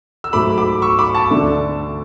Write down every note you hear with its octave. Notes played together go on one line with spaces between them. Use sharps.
E6
G#2 F#3 A3 B5 D6
B5 D6
C#6 E6
B5 D6
A5 C#6
D2 D3 A3